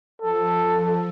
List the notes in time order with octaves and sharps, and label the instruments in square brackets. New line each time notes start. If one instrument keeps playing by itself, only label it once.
[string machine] F3 [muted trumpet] A4